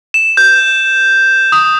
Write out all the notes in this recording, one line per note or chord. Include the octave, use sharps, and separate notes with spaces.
E7
G6
D#6